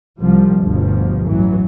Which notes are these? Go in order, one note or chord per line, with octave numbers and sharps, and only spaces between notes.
C2 F3 G3
G1 D2 G2 B2 F3
A1 E3 F#3